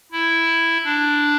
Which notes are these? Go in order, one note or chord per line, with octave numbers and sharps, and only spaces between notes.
E4
D4